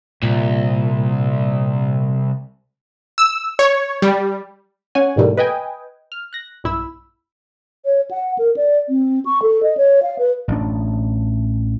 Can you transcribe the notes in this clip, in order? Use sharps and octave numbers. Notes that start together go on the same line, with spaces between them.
C2 A#2
E6
C#5
G3
C#4 C#5 F#5 G#5
G#2 B2 E3 G3 A3 A#3
B4 D#5 G5 G#5
F6
F#6 A#6
B1 G2 E4 B5 E6
C#5
F#5
A#4
D5
C4
C#6
A4
D#5
C#5
F5
B4
A1 D4